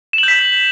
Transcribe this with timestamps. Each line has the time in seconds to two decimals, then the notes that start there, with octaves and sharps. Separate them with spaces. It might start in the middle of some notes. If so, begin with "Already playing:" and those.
0.13 E7
0.18 F#7
0.23 G6
0.28 B6